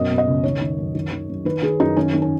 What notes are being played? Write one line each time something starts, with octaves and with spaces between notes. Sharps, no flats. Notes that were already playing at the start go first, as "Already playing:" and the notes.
Already playing: F#2 B2 D#5
B2
D#5
C#2
D#3 C#5
D#3
F#2
D#3
D#3
F#2
D#3 B4
D#3 G#4
F#2 D#4
D#3 C#4
D#3
C#4